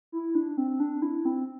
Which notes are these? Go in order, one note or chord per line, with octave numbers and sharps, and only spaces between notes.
E4
D4
C4
D4
E4
C4